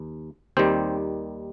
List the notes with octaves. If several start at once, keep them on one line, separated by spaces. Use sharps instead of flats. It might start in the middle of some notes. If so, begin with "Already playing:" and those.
Already playing: D#2
D#2 D#3 G3 C4 C5